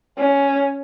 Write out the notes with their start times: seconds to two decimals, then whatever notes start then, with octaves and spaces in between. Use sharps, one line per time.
0.18 C#4